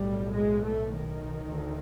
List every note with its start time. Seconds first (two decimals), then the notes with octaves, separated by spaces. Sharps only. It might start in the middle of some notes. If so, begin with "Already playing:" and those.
Already playing: B1 A2 G3
0.34 G#3
0.62 A3
0.92 D#3
1.50 D2